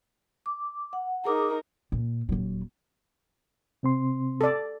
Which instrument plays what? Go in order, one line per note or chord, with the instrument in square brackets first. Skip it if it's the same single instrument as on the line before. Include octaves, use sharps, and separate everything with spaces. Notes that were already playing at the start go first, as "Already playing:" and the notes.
[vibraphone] D6
F#5
[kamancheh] D#4 A#4 [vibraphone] G#4 D6 D#6
[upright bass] A#2
D#1 F#3
[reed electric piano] C3 C4 C6
[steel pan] A4 D5